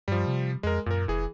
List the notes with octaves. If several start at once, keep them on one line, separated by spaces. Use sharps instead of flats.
G2 F3 G3
C3
F2 G#3 A#4
F#2 A#2 A#4
F1 E3 G#4